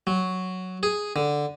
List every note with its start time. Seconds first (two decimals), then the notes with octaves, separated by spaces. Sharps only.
0.07 F#3
0.83 G#4
1.16 D3